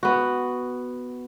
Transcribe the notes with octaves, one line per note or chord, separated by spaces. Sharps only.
B3 F#4